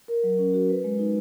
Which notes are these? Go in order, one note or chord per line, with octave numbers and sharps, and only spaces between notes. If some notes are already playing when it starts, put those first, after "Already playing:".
A#4
F#3
C#4
F#4
B4
G#3
D#4